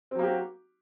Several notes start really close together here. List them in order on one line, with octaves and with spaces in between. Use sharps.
C4 F#3 A#3 G4 F#4